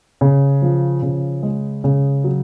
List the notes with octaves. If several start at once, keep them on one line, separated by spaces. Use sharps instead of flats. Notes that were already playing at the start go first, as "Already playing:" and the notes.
C#3
F3
C#3
G#3
C#3
F#3